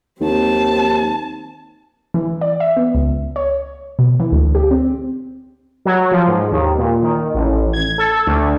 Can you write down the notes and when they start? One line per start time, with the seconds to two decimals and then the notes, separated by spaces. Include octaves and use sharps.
0.21 D#2 C4 A5
2.14 E3
2.41 D5
2.60 E5
2.77 B3
2.95 C#2
3.36 C#5
3.99 B2
4.20 E3
4.32 D2
4.55 G4
4.71 C4
5.85 F#3
6.12 F3
6.28 G#2
6.51 D#2
6.78 A#2
7.03 D#3
7.34 A1
7.73 G#6
7.98 A4
8.27 D2